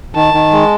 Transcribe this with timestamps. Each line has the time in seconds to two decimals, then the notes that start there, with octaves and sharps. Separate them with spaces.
0.15 D#3 A5
0.34 D#3
0.52 G#3